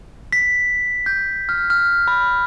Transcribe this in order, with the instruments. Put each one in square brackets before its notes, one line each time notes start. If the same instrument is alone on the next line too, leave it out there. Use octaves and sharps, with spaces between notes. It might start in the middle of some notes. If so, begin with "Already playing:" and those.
[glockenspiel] B6
G6
F6
F6
B5